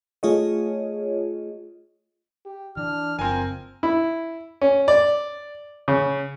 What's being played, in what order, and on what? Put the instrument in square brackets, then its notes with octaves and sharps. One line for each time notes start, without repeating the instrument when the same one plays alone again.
[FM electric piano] A3 F4 G#4 C#5 D#5
[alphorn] G4
[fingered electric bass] E3 [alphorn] D4 [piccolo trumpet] F6
[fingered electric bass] F#1 [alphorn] F3 [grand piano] C4 G#5 [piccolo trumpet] A#4
[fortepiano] E4
C#4
D5
C#3